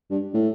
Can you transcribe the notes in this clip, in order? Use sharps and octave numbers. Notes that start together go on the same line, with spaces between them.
G2
A2